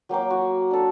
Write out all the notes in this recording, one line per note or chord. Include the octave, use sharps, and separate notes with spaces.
F#3 A#3 G5 D6
F#4
D4 A4